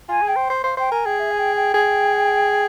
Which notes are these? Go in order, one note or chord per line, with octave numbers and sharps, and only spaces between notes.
F4 G#5
G#4
G5
C5
C5
C5 F5
C5 G5
A#4 G#5
G#4 G5
E5
G#5
G5
G5
G#4